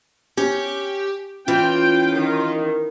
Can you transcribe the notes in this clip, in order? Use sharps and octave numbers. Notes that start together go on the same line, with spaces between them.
C#4 G4 C#5
E3 C#4 F4 G5
D#3